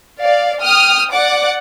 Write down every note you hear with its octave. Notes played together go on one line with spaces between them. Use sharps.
D5 F5
G5 D#6 F6
D5 F#5 D6